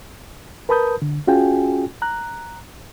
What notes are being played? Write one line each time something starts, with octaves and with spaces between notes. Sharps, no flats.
A#4 B4 A5 B5 D#6 G6
D3
C#4 F4 F#4 G#4 G5 G#5
A#5 F#6